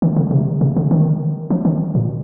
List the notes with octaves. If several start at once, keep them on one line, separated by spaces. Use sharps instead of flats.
D#3
D3
C3
C3
D3
D#3
F3
D#3
A#2